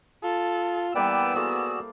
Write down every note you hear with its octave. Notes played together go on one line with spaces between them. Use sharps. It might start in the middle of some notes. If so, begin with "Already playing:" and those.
F4 A4
E3 G3 A#3 B3 B4 D5 G5 E6
A#3 F#4 G#4 A4 C5 D5